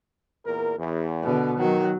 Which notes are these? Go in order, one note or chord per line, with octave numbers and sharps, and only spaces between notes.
E2 A#2 A#4
E2
B2 D3
D#3 F#3